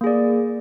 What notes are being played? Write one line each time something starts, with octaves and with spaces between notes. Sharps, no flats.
A#3 G#4 D5